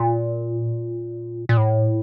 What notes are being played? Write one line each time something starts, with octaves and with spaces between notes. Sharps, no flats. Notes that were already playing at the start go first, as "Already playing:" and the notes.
Already playing: A#2
A#2
A2